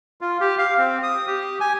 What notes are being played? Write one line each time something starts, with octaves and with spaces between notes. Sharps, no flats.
F4
G4
F5
C4
D#6
G4
G#5